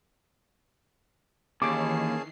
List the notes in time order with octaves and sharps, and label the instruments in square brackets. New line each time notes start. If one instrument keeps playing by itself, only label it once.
[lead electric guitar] D#2 [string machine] D#3 E3 C7 [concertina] C#4 G#4 A5 [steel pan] D6